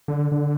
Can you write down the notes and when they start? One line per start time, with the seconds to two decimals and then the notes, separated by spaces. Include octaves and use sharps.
0.08 D3
0.32 D3